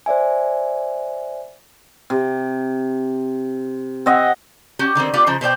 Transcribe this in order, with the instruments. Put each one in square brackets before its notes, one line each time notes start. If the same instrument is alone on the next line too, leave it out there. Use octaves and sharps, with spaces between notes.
[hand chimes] C5 D5 E5 G#5
[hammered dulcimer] C3
C4 D#5 F#5 G#5
[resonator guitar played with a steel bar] C#4 F#4 G4
D3 D#3 B3 C4
B3 F4 G4 B4 D5
C#3 F3 D#4 C5
B2 C5 D5 G5